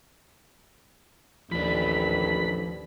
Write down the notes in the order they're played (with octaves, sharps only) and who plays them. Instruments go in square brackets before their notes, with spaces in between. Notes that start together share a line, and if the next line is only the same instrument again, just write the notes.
[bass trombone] A1 [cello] D#2 [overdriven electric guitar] F3 D4 [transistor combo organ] B5